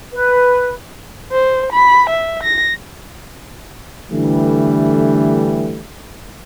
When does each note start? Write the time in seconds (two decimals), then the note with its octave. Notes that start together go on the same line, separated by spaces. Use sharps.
0.14 B4
1.32 C5
1.72 B5
2.10 E5
2.43 A#6
4.11 D3 E3 G3 A3